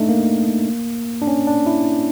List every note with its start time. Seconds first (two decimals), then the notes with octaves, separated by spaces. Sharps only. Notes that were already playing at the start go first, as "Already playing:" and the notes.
Already playing: A3 D4 D#4
0.09 A#3
1.22 D4
1.27 C#4
1.47 D4
1.66 E4